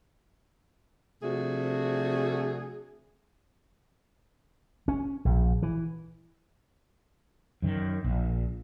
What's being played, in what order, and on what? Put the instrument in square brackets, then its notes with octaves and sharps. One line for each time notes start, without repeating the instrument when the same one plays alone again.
[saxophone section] C3 F3 A3 D4 F#4 G#4
[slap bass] C#4
A#1
E3
[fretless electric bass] F#2 D#3
A#1